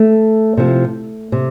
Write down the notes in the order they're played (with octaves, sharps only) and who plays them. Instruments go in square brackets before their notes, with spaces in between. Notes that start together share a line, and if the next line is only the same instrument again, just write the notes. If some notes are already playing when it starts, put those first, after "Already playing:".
Already playing: [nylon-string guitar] A3
C3 F3
C3